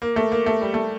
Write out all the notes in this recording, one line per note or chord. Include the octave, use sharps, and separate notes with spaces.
A#3
A3
A#3
A3
G3
A3